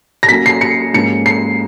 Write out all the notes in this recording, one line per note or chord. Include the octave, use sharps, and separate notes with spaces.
A#6
F#3 A#3 C#4 B6
C7
C#7
G#2 F3 A#3 C#4 C#7
C7